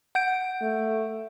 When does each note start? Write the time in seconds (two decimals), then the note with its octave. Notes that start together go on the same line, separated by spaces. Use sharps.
0.15 F#5 G6 D7
0.62 A3